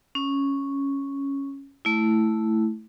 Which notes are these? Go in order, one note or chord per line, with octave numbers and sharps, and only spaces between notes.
C#4
A3 E4